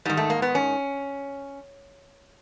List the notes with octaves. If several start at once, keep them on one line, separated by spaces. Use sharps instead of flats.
G#2 D#3 G3
A3
A#3
B3
C#4